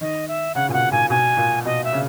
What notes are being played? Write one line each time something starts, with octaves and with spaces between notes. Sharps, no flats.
D#3 D#5
E5
C#3 F#5
A#2 G#5
B2 F#5
A#2 G#5
B2 G#5
A#2
B2 D#5
E5
C#3